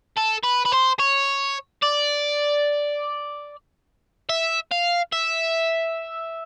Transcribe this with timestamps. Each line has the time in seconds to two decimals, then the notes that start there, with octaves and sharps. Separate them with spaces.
0.18 A4
0.44 B4
0.66 B4
0.72 C5
1.00 C#5
1.83 D5
4.29 E5
4.71 F5
5.13 E5